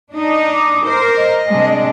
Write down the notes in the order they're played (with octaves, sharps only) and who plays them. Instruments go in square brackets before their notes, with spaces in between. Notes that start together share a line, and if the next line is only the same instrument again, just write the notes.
[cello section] D4 D#4
[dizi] D6
[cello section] A#4 C5
[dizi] D#5
[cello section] C3 G#3 D4